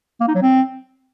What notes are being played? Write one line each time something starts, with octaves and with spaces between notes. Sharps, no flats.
A#3
D#4
F#3
C4